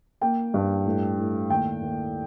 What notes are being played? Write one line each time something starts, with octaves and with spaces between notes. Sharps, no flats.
A#3 G5
G2
A2
A2
D#2 G5
D#2